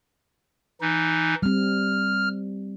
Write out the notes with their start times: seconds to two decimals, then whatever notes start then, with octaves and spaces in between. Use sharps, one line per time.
0.81 E3 D#4
1.42 G3 C4 F6